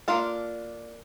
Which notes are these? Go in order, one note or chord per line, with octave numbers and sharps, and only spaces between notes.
A#3 D4 F4 A4